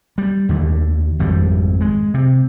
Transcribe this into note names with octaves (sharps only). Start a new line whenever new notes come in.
G3
D#2 D3
G#1 F2 G3
G#3
C3